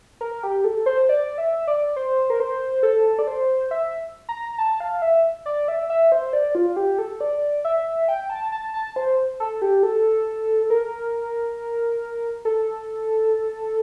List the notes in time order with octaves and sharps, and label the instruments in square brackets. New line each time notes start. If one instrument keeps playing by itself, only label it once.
[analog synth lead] A#4
G4
A4
C5
D5
E5
D5
C5
A#4
C5
A4
D5
C5
E5
A#5
A5
F5
E5
D5
E5
E5
C5
D5
F4
G4
A4
D5
E5
G5
A5
A5
A5
C5
A4
G4
A4
A#4
A4